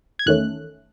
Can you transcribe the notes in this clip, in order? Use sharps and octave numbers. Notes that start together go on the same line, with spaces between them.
G#6
E2 D#3 A3 C#4 F#6